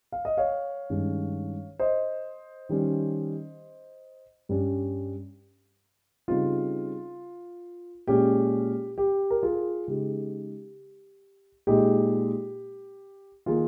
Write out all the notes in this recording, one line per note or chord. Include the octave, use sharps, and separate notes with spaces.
F5
D#5
C#5 F5
G2 D#3 G#3 C#4
C5 D#5
D#3 G3 C#4
G2 G3 C#4
C#3 G3 C4 D#4 F4
A#2 G#3 C#4 G4
G4
A#4
F4 G#4
C#3 G#3 D#4 G4
A#2 G#3 D#4 G4
D#3 A#3 D#4 F4 G#4